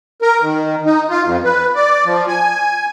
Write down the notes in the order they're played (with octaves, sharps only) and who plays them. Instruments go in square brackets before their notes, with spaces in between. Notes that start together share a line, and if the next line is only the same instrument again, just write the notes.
[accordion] A#4
D#3
D#4
F4
F2
B4
D5
F3
G#5